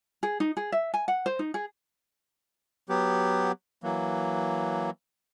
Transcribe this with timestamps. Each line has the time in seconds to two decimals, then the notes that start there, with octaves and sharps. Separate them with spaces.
0.23 G#4
0.40 D#4
0.57 G#4
0.72 E5
0.94 G#5
1.08 F#5
1.26 C5
1.39 D#4
1.54 G#4
2.89 F#3 B3 G4
3.83 E3 F#3 A#3